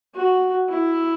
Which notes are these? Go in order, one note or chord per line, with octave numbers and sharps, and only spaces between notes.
F#4
E4